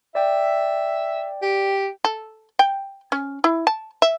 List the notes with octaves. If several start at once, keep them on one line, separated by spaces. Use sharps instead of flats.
D5 E5 G5
G4
A4
G5
C#4
E4
A5
E5